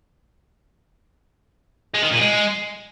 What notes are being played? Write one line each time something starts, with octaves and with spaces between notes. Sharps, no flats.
G#3
D#3
A#2
G#3